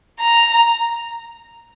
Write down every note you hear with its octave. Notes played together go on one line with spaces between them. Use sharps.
A#5